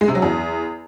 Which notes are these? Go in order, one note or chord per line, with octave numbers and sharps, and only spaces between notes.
G#3
C3
F#3
E2